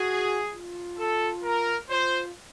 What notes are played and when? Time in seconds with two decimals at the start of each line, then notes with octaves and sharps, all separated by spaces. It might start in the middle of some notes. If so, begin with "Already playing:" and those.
Already playing: F#4 G#4
0.51 F4
0.98 A4
1.43 A#4
1.89 F4 C5